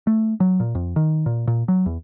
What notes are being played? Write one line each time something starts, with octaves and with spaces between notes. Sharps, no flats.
A3
F#3
A#2
F2
D#3
A#2
A#2
F#3
E2